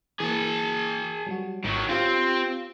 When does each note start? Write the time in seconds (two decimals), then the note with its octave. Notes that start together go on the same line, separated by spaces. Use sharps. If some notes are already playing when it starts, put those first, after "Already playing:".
0.20 E3 A#3 G#4 A5
1.27 F#3 G3 F#4
1.65 G#1 D#3 F#3
1.89 C4 F4 G4 F5